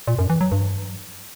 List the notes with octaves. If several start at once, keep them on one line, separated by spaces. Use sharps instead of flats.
A#2
F#2
E3
F#3
G2